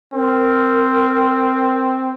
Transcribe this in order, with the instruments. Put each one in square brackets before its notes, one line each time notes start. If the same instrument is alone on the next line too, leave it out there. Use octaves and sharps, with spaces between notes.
[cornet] C4 [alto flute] A#4